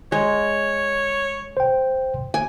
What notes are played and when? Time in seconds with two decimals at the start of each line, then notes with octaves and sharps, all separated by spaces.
0.12 G#3 C#5
1.57 C5 G5
2.34 G#5